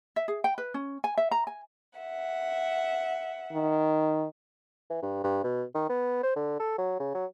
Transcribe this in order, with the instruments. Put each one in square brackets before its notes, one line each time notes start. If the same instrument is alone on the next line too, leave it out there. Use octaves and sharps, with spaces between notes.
[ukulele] E5
G#4
G5
B4
C#4
G#5
E5
A#5
G#5
[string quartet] E5 F#5
[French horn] D#3
[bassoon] E3
G2
G2
B2
D#3
B3
C5
D3
A4
F#3
C#3
F#3